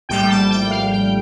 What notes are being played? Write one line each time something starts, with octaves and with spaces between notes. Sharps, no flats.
A#1 A2 G3 G5
A5
G5
F5
G5